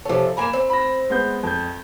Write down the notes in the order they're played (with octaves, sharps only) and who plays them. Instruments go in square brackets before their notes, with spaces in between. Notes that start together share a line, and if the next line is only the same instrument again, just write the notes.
[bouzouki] C3 C#4 [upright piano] F3 A4
[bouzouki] A#3 G#5 A#5 [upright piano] B5 E7
[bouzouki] C4
[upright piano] B5 A#6
G#3 B3 G6
F2 G6